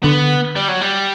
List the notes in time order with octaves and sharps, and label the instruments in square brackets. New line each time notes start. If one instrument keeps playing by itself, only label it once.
[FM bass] D3 [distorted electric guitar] B3
[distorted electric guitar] G3
F#3
G3